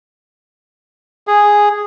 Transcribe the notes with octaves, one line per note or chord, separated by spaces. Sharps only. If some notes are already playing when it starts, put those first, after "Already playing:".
G#4